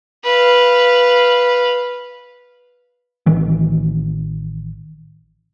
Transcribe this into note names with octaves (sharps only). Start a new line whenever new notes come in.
B4 F5
A1 D#3 E3